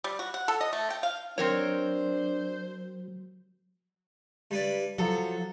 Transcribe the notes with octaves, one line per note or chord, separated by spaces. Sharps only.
G3
F#4
F#5
A4
D#5
A3
G5
F5
F#3 C4 D4 A#4 C5 C#5
G2 B4 D5
F3 F#3 A4